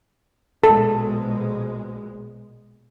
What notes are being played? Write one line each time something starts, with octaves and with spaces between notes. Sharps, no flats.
A#1 B2 G#3 A4